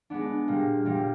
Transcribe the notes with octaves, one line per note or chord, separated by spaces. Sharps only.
G#3 B3 D4
A#2 G3 A#3
A#2 G3 A#3